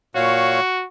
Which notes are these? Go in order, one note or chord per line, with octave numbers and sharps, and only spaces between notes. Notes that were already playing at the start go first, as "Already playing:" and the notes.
A#2 F#4 C#5 F5